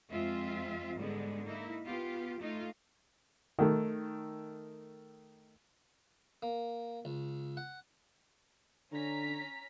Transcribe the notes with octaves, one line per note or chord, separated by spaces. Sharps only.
F2 G#3 C4 F4 E5
G#2 D3 G3 G#3 B3
A#3 D#4 E4
B3 F4 G4
A3 D#4 F4
D#3 A3
A#3
C#2
F#5
D3 C#4 A#5 B6